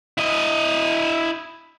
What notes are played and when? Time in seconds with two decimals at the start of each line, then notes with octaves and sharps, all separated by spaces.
0.18 E4 D#5